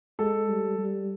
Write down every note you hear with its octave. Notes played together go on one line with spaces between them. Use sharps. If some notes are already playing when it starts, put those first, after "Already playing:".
G#3 A4
G3
G3